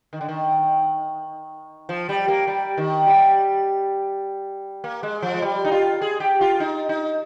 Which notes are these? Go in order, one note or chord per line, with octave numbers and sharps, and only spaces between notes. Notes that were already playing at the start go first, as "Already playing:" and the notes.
D#3
D3
D#3
F3
G3
A#3
G3
D#3
G3
A#3
G#3
F3
G#3
G3
D#4
F4
G#4
G4
F4
D#4
D#4